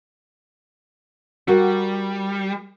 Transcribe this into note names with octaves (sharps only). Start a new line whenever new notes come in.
G3 F#4 A#4